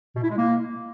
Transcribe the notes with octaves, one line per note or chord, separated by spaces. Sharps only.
B2
E4
G#3
A#3